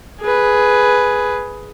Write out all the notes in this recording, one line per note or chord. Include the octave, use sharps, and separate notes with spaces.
G#4 B4